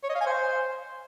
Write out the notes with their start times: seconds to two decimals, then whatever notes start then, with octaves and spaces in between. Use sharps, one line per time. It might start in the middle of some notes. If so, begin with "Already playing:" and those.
0.04 C#5
0.09 D#5
0.15 F5
0.21 G#5
0.26 C5